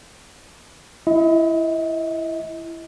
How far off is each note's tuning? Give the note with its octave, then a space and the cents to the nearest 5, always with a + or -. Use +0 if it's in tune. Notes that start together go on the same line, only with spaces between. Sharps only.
E4 +15 D#5 +40